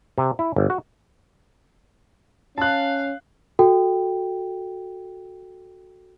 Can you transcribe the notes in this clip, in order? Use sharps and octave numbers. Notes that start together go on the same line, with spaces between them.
C3
E4
G1
F#4
C#4 F5 A5 F#6
F#4 A4 G5